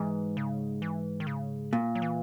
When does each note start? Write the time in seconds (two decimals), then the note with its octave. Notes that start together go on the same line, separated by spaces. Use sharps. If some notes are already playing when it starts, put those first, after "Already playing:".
Already playing: G#2 E3
0.37 C#3
0.82 E3
1.20 D#3
1.27 C#3
1.73 A#2
1.95 F#3
2.02 E3